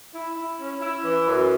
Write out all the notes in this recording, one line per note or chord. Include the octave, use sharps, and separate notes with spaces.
E4
E4
C#4
E4
E3
F#2